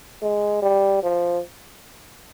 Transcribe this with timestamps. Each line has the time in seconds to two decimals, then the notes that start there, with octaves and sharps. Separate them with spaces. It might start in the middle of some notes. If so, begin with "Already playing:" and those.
0.22 G#3
0.62 G3
1.03 F3